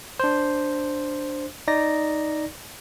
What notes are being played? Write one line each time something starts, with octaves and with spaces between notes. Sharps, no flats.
D4 C5
D#4 D5 A#6